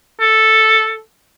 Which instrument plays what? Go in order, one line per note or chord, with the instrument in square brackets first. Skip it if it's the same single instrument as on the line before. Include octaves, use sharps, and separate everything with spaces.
[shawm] A4